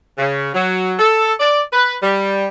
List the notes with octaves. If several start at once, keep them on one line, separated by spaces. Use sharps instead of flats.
C#3
F#3
A4
D5
B4
G3